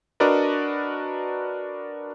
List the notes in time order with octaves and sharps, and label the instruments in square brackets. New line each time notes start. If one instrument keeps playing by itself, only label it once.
[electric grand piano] D4 F#4 A#4 B4 D5 D#5